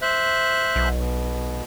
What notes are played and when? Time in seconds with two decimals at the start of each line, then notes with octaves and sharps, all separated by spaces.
0.02 C5 E5 F#6
0.76 B1
0.99 B2